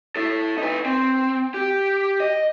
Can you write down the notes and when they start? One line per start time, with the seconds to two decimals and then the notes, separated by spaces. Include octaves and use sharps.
0.16 E4 A4
0.58 D#4 B4
0.86 C4
1.54 G4
2.20 D#5